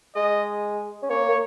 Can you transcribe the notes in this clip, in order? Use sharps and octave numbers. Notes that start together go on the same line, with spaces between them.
G#3 D#5
C#4
A#3 C#5
A#3